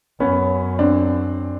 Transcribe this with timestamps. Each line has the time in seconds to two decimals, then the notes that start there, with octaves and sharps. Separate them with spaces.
0.20 F#2 B3 C#4
0.79 C4 D4